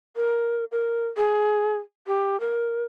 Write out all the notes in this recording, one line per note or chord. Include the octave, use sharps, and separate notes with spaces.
A#4
A#4
G#4
G4
A#4